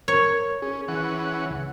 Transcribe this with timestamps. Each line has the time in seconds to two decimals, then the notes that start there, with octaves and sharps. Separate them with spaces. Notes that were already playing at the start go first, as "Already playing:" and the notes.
0.08 A#4 C#5
0.62 C#4 G#4
0.88 E3 C#4 F#5
1.51 C#2